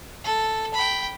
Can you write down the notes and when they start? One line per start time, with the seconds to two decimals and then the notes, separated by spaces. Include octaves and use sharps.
0.24 A4
0.74 G5 B5